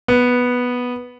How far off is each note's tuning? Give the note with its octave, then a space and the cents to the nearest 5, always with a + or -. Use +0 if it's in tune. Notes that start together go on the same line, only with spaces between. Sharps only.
B3 -5